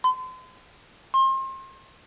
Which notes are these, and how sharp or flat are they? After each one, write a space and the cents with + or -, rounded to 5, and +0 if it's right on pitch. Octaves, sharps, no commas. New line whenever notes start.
C6 -35
C6 +35